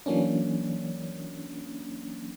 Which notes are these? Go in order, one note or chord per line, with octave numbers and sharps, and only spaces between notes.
E3 F#3 A#3 C#4 D4